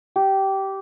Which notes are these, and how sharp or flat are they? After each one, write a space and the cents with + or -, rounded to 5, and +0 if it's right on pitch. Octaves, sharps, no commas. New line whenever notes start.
G4 -15